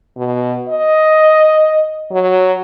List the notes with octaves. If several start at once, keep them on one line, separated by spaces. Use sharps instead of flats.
B2
D#5
F#3